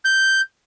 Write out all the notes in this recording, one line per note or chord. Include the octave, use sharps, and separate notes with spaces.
G6